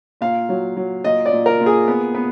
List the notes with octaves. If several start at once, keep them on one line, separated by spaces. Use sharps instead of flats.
A#2 F5
F#3
F#3
A#2 D#5
D5
A#2
A#4
A#2
G#4
B3
B3